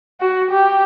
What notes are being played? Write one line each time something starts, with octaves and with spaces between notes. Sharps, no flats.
F#4
G4